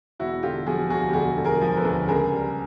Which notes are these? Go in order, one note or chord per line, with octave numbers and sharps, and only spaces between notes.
E1 E4 F#4
D3 F4 G4
F3 F#4 G#4
D2 F#4 G#4
G4
E1 F#4 G#4
D3
G#4 A#4
F3
A4 B4
D2
C#2 G#4 A#4
G3